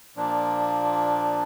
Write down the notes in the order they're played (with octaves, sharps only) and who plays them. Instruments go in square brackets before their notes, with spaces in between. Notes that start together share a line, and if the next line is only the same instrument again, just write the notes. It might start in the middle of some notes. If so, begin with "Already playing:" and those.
[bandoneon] A#2 F3 A#3 D4